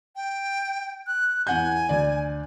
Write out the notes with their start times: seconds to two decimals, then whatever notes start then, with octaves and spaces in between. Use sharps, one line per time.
0.16 G5
1.07 F#6
1.47 E2 F#5 G#5 G6
1.89 D2 D5